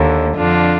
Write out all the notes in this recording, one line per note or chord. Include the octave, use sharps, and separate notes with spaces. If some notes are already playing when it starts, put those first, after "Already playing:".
Already playing: D#2 D3
F2 D3 D4 F4